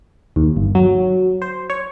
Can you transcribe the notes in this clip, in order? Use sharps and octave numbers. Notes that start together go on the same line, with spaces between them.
D#2
G1
F#3
C5
C#5